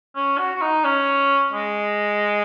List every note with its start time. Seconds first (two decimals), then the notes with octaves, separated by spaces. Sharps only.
0.15 C#4
0.38 F#4
0.55 F#4
0.61 D#4
0.84 C#4
1.53 G#3